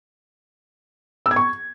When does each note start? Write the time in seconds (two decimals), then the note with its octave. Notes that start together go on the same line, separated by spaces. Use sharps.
1.26 E6
1.31 G#6
1.36 C#6